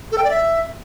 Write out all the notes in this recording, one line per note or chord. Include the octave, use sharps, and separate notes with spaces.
A4
G5
D5
E5